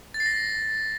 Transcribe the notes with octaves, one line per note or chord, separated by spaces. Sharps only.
A6
C7
A#6